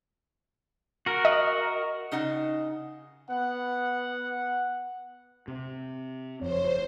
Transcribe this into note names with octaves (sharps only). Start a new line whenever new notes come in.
F#4 A#4
D#5
C#3 D#4 D#5 F#5
B3 F#5
C3
F#1 F2 C5 C#5